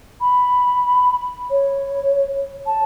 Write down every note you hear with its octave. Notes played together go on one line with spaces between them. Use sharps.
B5
C#5
A5